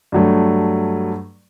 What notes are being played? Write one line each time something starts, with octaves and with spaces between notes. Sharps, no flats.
G2 F#3 A3